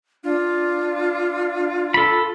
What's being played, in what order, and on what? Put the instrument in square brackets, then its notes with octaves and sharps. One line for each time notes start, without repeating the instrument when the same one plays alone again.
[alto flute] D4 [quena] F4
[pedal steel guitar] A4 B5